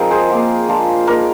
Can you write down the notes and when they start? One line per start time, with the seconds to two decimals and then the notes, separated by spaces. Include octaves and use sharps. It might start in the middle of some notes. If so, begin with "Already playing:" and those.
Already playing: F3 G#3 C4 D#4 A#4 D#5
0.11 G#4 C5
0.30 A#3 F4
0.69 G#3 D4 F4
1.07 A#3 D#4 A#4 D5